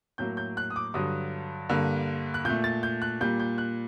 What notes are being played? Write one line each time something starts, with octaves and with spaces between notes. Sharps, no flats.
A2 F#3 A#3 G6
G6
F#6
D#6
D6
G2 D3 F#3 D#6
G2 D3 G3 A#3
F#6
A#2 A3 G6
A6
G6
F#6
A#2 G3 A#3 G6
G6
F#6